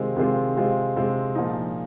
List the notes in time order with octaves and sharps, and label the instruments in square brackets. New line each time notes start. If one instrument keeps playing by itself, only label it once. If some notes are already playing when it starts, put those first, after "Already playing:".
Already playing: [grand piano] C3 D#3 G#3 C4 F4
C3 D#3 G#3 C4 F4
C3 G#3 C4 F4
C3 G#3 C4 F4
A#2 F3 G#3 D#4